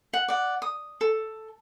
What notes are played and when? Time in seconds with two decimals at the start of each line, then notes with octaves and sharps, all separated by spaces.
0.13 F#5
0.28 D5 F#5
0.62 D#6
1.01 A4